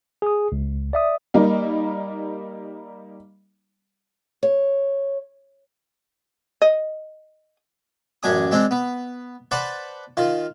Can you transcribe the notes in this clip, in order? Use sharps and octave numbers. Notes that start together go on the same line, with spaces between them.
G#4 D#6
C#2
D5 E5 D#6
G3 A#3 D#4
C#5
D#5
A1 F#2 D4 G#5 D#6
G#3 C4 D4
B3
B4 C5 D5 F#5 A5
D#3 F4